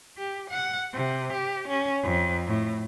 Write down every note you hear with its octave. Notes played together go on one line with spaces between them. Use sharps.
G4
F#5
C3
G4
C#4
F2
A2